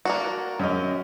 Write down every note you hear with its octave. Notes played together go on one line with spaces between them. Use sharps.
A#3 D4 F#4
F#2 D#5